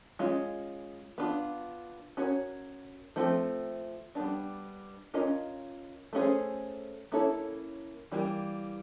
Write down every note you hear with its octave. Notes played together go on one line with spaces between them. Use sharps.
G#3 C#4 F4
B3 D4 F4
C#4 F#4 A#4 C#5
F3 A3 C4
G3 B3 D4
C#4 F4 A#4 D#5
A3 C#4 E4 G#4 C5
A#3 C#4 E4 A4 C#5
E3 G3 A#3